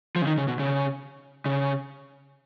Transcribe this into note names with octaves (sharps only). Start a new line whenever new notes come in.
F3
C#3
D#3
C#3
B2
C#3
C#3